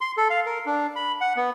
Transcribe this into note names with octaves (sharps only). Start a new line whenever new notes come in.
C6
A4
F5
A#4
D4
B5
F#5
B3